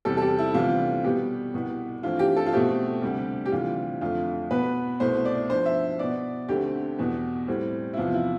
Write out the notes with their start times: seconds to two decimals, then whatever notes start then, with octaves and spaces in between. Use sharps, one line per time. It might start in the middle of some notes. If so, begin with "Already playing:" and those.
0.05 E2 C3 G3 A4
0.17 A4
0.22 G4
0.38 E4
0.54 D2 C3 E3 G3 B3 F4
1.04 B2 G3 B3 G4
1.54 C2 B2 B3
2.03 G2 E3 A3 C4 F4
2.19 G4
2.37 A4
2.46 F4
2.53 B2 A3 C4 G4
3.02 D2 C3 G3
3.46 G4
3.52 D2 C3 E3 G3 F4
4.01 F2 D3 A3 F4
4.51 B2 B3 B4
5.00 C2 B2 A3 C5
5.25 D5
5.49 G2 F3 B3 C5
5.66 E5
5.99 B2 B3 D5
6.48 D2 D3 A3 C4 G4
6.98 E2 B2 B3
7.48 A2 G3 C4
7.93 E4
7.97 E2 C3 F3 B3 F4
8.14 E4